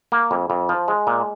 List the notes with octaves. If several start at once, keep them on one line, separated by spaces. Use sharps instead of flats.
A#3
F2
F2
F3
G#3
A#2